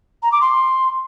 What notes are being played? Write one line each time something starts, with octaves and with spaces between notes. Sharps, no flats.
A#5
D6
C6